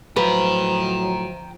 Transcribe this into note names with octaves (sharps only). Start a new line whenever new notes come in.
A2 F3 F#3 B4 G5 A#5